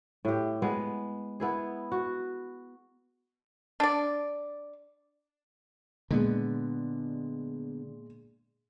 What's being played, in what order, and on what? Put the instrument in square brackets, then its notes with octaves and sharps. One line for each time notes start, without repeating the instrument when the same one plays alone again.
[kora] A2 G4
G#3 B3
B3 E4 G#4
F#4
[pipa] D4 D5
[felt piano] A#2 G#3 D4 [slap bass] D3 B3